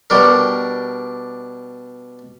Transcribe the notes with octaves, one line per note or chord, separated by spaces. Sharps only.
B2 G3 D4 A#4